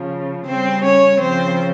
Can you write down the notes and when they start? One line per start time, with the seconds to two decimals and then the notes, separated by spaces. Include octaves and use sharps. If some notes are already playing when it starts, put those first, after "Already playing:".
Already playing: C#3 F3
0.47 C#3 G3 C4 C5
0.84 C#4 C#5
1.20 C#3 F3 C4 C5